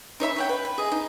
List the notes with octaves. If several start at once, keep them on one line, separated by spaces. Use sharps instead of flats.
D#4 C#5 E5 B5
C#5 F#5 G5
B4
B4
G#4 D#5
D#4